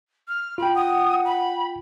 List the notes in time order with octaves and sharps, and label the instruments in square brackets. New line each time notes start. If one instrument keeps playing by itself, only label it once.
[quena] F6
[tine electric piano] F4 G5 [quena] B5
[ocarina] F#5 [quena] D#6
[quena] B5